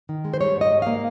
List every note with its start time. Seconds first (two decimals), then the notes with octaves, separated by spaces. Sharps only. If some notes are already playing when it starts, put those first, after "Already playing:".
0.09 D#3
0.25 G#3
0.34 C5
0.40 G3 C#5
0.56 G#2 D#5
0.72 G#2
0.82 A#3 F5